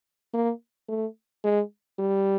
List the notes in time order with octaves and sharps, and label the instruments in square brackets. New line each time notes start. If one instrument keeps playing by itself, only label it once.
[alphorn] A#3
A3
G#3
G3